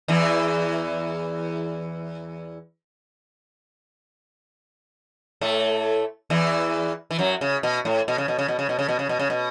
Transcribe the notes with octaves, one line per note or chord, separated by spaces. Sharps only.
E2 E3
A2 A3
E2 E3
E3
F#2 F#3
C#3
B2
A2
B2
C#3
B2
C#3
B2
C#3
B2
C#3
B2
C#3
B2
C#3
B2